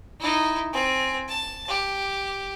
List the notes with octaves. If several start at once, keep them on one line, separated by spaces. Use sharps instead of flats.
D#4 E4
C4 G#5
A5
G4